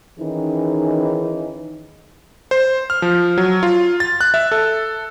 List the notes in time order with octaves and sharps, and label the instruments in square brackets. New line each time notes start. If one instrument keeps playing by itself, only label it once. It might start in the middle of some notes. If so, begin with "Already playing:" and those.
[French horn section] D#3 E3 C#4 D#4 G#4
[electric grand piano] C5
F6
F3
F#3
F4
A6
F#6
E5
A4